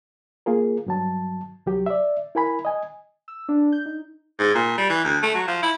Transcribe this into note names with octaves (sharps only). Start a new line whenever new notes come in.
A#3 F4 G#4 A#4
G2 F#3 A5
C2 F#3 G4
D5 E5
E4 A#4 G#5 B5
D#5 G#5
E6
D4
G6
D#4
G#2
A#2
G3
E3
D2
A3
F#3
F3
E4